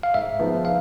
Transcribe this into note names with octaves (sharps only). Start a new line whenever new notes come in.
F5
G#2 E5
F3 G#3 B3 D#4
F5